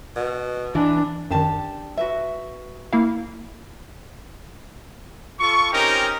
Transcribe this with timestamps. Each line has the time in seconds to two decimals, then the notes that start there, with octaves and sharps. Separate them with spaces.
0.16 B2
0.75 E3 D4
1.31 F#2 D#3 D4 G4 A5
1.97 F#4 B4 E5
2.93 A#3 E4 F5
5.40 F4 A4 C#6
5.72 C4 C#4 D#4 G4 A#4